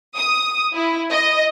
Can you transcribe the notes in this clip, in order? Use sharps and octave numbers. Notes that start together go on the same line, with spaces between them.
D#6
E4
D#5